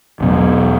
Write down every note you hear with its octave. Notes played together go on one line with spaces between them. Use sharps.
E2 B2 F#3